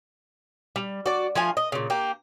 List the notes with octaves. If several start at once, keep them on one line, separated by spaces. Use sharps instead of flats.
G3
F#4 D5
F3 A3 F4 G#5
D#5
A#2 C#3
A#3 G4